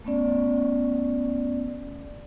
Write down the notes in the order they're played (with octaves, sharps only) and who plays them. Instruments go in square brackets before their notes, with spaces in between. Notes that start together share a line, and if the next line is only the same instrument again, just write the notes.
[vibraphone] A3 B3 C#4 D5